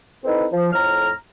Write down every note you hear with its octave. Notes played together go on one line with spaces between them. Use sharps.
C4 D#4 E4 A4 B4
F3
F2 A2 A#5 F6